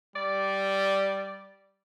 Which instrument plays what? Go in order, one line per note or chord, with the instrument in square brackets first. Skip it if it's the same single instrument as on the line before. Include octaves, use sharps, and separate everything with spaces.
[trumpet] G3 [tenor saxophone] D5